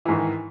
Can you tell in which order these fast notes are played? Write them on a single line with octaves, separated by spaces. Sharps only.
E3 G#2 D#3